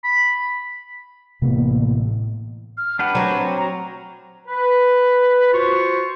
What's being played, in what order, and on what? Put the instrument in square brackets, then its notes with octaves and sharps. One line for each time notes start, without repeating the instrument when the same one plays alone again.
[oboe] B5
[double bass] A1 [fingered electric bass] C3 A#3 B3
[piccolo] F6
[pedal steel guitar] D4 G4 B4 [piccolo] F#5
[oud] F#3 C4
[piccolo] A#5
[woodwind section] B4
F4 F#4 C5 C#6